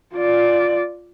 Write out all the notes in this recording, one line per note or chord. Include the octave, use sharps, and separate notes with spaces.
F4 D5